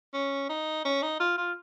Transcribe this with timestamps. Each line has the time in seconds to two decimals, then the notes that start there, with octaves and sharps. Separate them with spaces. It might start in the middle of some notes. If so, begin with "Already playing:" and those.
0.14 C#4
0.49 D#4
0.85 C#4
1.02 D#4
1.20 F4
1.37 F4